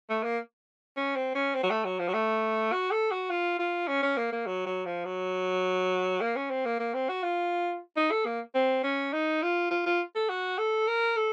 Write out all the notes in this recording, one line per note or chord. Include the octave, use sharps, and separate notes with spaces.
A3
A#3
C#4
C4
C#4
C4
F#3
A3
F#3
F3
F#3
A3
F#4
A4
F#4
F4
F4
C#4
C#4
A#3
A#3
F#3
F#3
F3
F#3
A#3
C#4
C4
A#3
A#3
C4
F#4
F4
D#4
A4
A#3
C4
C#4
D#4
F4
F4
F4
A4
F#4
A4
A#4
A4